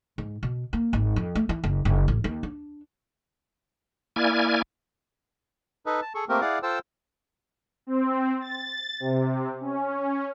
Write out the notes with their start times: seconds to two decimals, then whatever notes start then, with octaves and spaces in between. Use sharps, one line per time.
0.18 G#2
0.43 B2
0.73 A#3
0.93 G#1
1.16 F2
1.35 A3
1.49 E3
1.64 F#1
1.85 F#1
2.08 A1
2.24 D#2
2.43 D4
4.16 A#3 E4 D5 G#5 F6 G#6
5.86 D#4 A4 B4 D#5
6.02 A5
6.15 G#4 A4 C#6
6.29 A3 A#3 C4 G4 A#4
6.41 E4 G#4 D5 F5 F#5
6.63 F4 A4 C5 G5 A5 E6
7.87 C4
8.41 A6
9.00 C3
9.61 C#4